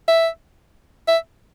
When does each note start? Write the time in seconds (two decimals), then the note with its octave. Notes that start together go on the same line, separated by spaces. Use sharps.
0.08 E5
1.08 E5